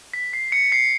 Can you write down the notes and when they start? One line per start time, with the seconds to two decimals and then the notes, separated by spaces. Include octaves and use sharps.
0.14 B6
0.33 C7
0.52 C#7
0.72 C7